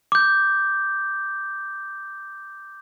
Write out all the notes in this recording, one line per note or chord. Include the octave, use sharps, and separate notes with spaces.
D6 G6